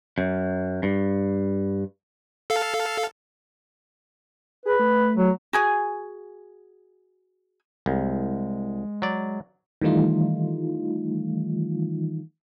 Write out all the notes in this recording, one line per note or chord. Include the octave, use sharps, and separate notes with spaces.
F#2
G2
A4 F5
G#4 B4
A3
F#3
F#4 G#4 G#5
C2 G#3
F#3 D5
D#3 E3 G3 A3 D#4 F4